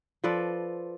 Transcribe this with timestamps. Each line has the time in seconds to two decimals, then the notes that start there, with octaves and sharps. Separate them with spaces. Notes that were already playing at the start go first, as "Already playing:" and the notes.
0.24 F3 A4 B4 D5